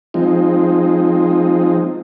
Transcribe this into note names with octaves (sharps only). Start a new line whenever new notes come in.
F3 G#3 C4 D#4